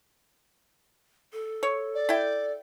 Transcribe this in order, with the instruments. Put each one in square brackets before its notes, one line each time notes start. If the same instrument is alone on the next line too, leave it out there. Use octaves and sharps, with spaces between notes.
[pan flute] A4
[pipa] C#5
[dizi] D5
[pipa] E4 G5